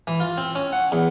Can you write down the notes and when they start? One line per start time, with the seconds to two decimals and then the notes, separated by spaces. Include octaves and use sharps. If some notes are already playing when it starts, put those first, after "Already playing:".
0.07 E3
0.20 F4
0.38 C4
0.55 C#4
0.73 F#5
0.92 E2